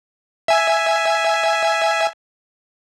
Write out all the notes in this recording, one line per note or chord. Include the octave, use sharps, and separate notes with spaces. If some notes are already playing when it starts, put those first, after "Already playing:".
E5 G#5